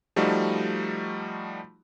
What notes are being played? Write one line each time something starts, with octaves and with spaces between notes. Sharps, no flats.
F3 G3 A3 D#4 F#4